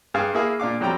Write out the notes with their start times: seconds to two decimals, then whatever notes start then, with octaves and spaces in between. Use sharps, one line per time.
0.14 G2 G#4 F5
0.33 A#3 E4 G#4 F5
0.60 A#2 D4 F5 D6
0.80 F2 F#3 G3 C4 G5 A#5